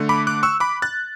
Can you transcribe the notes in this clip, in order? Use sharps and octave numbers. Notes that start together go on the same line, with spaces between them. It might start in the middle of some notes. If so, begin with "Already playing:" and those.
Already playing: D3 A3
B5 D6
D6 F#6
C#6 E6
B5 D6
F#6 A6